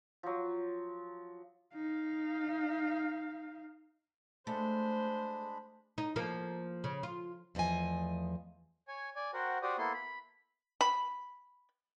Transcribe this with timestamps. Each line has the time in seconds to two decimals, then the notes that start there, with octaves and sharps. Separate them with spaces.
0.23 F3 F#3
1.74 D#4 F5
4.47 G#3 A3 D4 C5 B5
5.98 D#4
6.16 F3 A#3
6.84 C#3
7.03 F4
7.55 E2 F3 A3 D#5 G#5
8.88 C#5 G#5
9.16 D5 G#5
9.34 F#4 A#4 C5 F#5 G5
9.62 F#4 G4 C5 D5 D#6
9.78 A#3 B3 E4 A4 C6
9.94 B5
10.81 B5